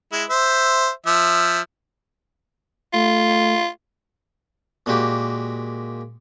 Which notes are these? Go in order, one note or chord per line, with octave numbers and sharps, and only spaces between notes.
G#3 E4
C5 E5
F3 E5
A3 F4
A#2 G#3 A#3 F#4 G4